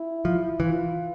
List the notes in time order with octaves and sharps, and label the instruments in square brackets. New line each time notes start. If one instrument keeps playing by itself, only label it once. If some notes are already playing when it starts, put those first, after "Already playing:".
Already playing: [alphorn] E4
[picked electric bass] F3
[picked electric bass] E3 [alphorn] F4